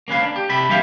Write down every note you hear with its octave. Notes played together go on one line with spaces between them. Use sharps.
A#3 C#4 B4 F5
D4
G4
C3 A4 B5
G2 E3 A#3 E4 G4 F5